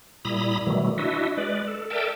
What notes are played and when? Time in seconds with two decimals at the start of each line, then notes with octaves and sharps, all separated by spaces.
0.25 A#2 G3 E4 A#5 B5 D#6
0.67 B2 D#3 E3 F#3 G3 A3
0.98 D4 E4 F#4 D#5 E5
1.37 G#3 B4 D5
1.68 A4
1.90 A4 A#4 D5 E5 G5 A5